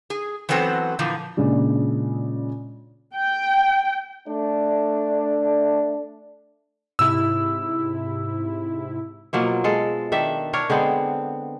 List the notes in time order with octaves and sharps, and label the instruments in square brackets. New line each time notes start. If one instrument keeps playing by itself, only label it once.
[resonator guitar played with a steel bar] G#4
E3 F#3 B3 C4 A4 C5
A#2 D3 E3 F3
[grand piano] A#2 C#3 G#3 D4
[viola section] G5
[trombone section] A3 D4
[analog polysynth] G#2 C3 E4 [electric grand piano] E6
[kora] B2 F3 F#3 A#3
G#3 A4
D#3 D4 E5
D4 A#4 C#5
D3 G#3 B3 C4